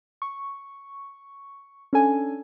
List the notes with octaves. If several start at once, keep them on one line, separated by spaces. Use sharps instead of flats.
C#6
C#4 D4 A4 G#5